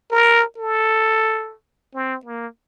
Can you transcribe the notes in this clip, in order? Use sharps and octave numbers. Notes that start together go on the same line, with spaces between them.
A#4
A4
C4
A#3